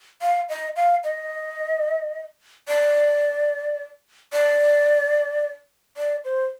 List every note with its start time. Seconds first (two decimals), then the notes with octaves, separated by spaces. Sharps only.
0.22 F5
0.49 D#5
0.76 F5
1.04 D#5
2.68 D5
4.33 D5
5.97 D5
6.25 C5